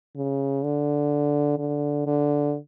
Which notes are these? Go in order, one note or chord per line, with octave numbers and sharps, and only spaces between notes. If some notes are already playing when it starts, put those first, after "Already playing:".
C#3
D3
D3
D3